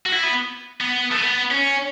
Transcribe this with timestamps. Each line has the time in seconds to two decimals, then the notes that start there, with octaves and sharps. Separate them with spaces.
0.06 F#4
0.12 E4
0.23 B3
0.81 B3
1.11 A3
1.16 B3
1.51 C#4